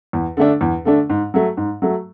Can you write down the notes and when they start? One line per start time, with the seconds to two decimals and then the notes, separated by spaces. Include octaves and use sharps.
0.13 E2
0.37 D3 A3 D4
0.61 E2
0.85 D3 A3 D4
1.09 G#2
1.34 F#3 A3
1.57 G#2
1.82 F#3 A3